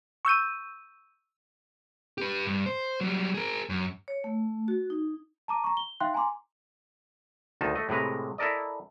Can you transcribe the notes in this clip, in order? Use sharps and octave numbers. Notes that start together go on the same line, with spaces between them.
C#6 E6 G6 D#7
G4 B4
G2
C5
F#3 G3
G#4 A#4
F#2
C#5
A3
F#4
D#4
A5 A#5 D6 D#7
A#5 C#6
G7
D#4 E5 F5 G5 C6 F#6
G#5 A#5 C6 D6
D2 D#3 D#4 A5
A3 D#5
A2 C3 G#3 B4 A#5
E4 A4 A#4 D5 D#5